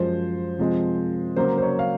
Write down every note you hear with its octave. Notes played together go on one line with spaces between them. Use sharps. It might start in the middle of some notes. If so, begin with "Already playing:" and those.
Already playing: F#2 F3 G#3 C5
C3 F3 G#3 C4
C#3 F#3 A#3 C5
C5
C#5
F5